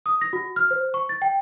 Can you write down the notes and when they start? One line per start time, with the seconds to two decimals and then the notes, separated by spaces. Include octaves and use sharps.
0.06 D#6
0.21 A#6
0.33 F#4
0.56 F6
0.71 C5
0.94 C#6
1.09 A6
1.22 G5